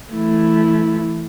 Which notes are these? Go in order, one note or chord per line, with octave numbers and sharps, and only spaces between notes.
E3 A3 E4